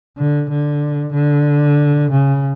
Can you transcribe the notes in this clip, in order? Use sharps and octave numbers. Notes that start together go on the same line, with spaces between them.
D3
D3
D3
C#3